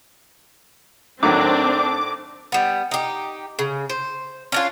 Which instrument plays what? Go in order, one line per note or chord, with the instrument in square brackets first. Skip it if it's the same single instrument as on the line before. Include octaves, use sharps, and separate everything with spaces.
[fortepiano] A2 D#3 F#3 [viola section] C4 D4 [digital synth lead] D6
[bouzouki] G3 B3
D#4 G4
C#3
C5
C#4 D4 F4